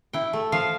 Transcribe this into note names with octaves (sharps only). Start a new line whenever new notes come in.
E4 G5
A3
F3 F5